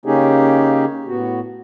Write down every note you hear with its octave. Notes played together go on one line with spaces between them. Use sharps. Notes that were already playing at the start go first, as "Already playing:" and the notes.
C#3 A#3 C#4 D#4 G4 G#4
A2 B3 F#4